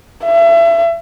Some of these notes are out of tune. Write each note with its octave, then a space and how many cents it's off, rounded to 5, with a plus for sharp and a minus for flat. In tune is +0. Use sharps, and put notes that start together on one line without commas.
E5 +35